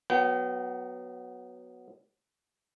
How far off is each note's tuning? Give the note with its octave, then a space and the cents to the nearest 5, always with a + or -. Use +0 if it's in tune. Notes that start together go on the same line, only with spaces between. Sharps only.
F#3 +0 B3 +0 G5 -35